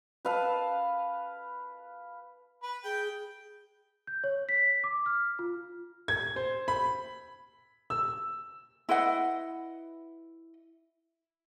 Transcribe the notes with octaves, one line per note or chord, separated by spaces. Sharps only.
B4 F5 A5
B4
G#4 G5
G6
C#5
B6
D6
F6
F4
G#6
C5
B5
E6
E4 B4 D#5 F#5